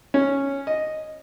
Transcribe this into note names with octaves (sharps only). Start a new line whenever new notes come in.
C#4
D#5